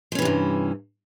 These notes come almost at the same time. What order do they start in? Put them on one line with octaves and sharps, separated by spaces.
F3 C#4 E3 C3 G2